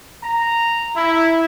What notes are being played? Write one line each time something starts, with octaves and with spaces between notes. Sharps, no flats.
A#5
E4